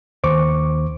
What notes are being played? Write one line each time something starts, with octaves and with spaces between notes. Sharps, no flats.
D#2 D#3 C5 C#6 D6